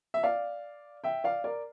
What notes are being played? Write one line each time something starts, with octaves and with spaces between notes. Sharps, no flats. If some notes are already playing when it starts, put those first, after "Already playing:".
E5
D5 F5
E5 G5
D5 F5
A#4 D5